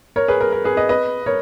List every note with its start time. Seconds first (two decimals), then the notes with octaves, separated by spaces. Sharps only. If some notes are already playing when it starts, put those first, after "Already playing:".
0.16 A#4 C#5
0.28 G#4 B4
0.41 A#4
0.52 A#4
0.64 G#4 B4
0.77 B4 D#5
0.89 B4 D#5
1.26 A#4 C#5